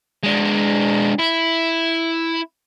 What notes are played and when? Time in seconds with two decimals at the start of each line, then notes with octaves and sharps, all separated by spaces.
0.24 G#3 D4
1.19 E4